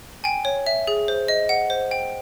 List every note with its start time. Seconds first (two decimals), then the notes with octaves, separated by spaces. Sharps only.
0.24 G5 G#5
0.45 C#5
0.67 E5
0.87 G#4
1.08 C5
1.28 D#5
1.49 F#5
1.70 C5
1.91 G5